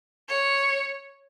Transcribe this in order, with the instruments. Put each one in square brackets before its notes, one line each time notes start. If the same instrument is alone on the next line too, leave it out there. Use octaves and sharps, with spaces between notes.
[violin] C#5